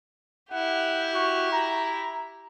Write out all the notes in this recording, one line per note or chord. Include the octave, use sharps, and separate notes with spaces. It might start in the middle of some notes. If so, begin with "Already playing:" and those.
E4 G4 F#5
F#4
A#5